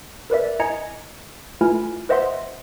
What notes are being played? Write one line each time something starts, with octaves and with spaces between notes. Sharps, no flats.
A#4 B4 D5 E5
E4 D#5 G#5 A#5 G#6 C#7
A3 E4 F4 B4 G#5 F6
B4 C5 D#5 E5 F#5 C6